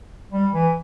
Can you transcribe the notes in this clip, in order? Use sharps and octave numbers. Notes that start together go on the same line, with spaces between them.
G3
E3